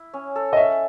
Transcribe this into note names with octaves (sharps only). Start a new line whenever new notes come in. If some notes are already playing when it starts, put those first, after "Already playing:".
Already playing: E4
C#4
A4
D#5
C#4 E5